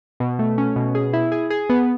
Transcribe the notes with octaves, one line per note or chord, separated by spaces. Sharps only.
B2
A3
C#4
B2
G#4
E4
G#4
G#4
B3